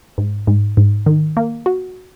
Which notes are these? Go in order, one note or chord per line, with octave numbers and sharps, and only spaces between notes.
G#2
G#2
G#2
D#3
A#3
F#4